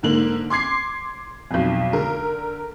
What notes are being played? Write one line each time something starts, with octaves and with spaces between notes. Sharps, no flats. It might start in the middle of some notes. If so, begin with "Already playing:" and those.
G#2 D3 A#3 F#7
C6 D6 G#6 C7
B1 F2
D3 A#4